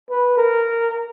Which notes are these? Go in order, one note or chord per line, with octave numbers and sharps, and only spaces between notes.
B4
A#4